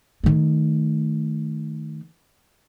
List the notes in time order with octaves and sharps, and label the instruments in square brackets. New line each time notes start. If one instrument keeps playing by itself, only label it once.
[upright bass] D#3 A3